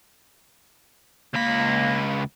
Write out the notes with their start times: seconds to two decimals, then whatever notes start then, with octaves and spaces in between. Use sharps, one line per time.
1.34 C#2 A#3 B5